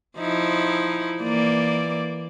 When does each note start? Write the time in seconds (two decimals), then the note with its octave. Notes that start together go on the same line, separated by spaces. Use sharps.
0.19 F3 D#4 E4
1.22 E3 A#3 D5